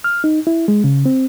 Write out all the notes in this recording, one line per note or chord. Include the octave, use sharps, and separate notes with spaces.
F6
D#4
E4
G#3
C#3
C4